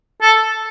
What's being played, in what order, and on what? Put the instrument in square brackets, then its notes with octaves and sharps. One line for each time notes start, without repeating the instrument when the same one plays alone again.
[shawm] A4